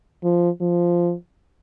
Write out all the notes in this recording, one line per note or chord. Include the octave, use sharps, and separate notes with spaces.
F3
F3